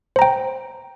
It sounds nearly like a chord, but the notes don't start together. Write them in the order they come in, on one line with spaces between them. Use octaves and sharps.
C5 A#5 G5